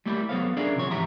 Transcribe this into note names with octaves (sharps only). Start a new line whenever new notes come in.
G3 A3 A#3 E4 G4
F#3 B3 A4 C5 C#5 F5
C#4 D4 G#4 A#4 D5 E5
C3 F3 C#5
G#2 E3 G4 E5 A#5